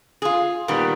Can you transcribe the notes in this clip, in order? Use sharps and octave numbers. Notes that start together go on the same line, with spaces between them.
F4 G#4
A#2 D#3 G3 B3